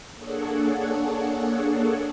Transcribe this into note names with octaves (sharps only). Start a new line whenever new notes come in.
A#3 D4 G#4 A4 C#5 F#5